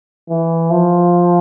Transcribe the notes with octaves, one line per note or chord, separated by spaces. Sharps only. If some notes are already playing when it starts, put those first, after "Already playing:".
E3
F3